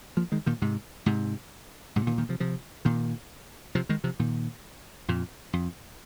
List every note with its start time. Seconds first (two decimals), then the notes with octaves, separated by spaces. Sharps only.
0.17 F3 A#3
0.32 D#3 G#3
0.46 A#2 D#3
0.62 G#2 C3
1.06 G#2 C3
1.96 G#2 C3
2.07 A#2 D#3
2.18 A#2 D#3
2.29 C3 F3
2.40 C3 F3
2.85 A#2 D#3
3.75 C3 F3
3.89 D#3 G#3
4.04 C3 F3
4.20 A#2 D#3
5.08 F2 A#2
5.53 F2